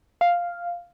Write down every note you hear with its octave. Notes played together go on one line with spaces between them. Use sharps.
F5